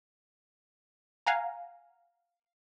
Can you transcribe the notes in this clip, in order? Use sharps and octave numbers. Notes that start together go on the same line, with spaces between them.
F5 F#5 G#5 A#5